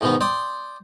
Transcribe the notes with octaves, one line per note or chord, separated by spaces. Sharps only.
G#2 B2 D#3 B3
D5 G5 C6 D#6